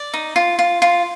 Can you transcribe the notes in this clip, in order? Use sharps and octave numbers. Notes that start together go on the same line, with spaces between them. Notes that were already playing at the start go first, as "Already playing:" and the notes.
Already playing: D5
D#4
F4
F4
F4